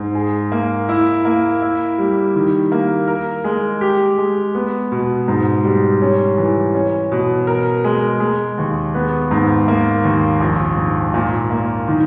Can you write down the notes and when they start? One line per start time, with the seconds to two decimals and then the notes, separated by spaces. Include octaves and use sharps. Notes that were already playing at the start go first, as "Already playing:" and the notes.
Already playing: G#2
0.15 G#4
0.52 A#3
0.89 E4
1.25 A#3
1.62 E4
1.98 G3
2.35 D#3
2.72 A#3
3.07 A#4
3.44 G#3
3.81 G4
4.18 G#3
4.55 B3
4.92 B2
5.28 G#2
5.64 G3
6.02 C#4
6.38 E3
6.75 C#4
7.12 B2
7.47 A#4
7.84 G#3
8.20 G#3
8.58 D#2
8.94 B3
9.31 G#2
9.68 A#3
10.04 D#2
10.40 A#1
10.77 G#2
11.14 A#2
11.51 A#3
11.88 D#3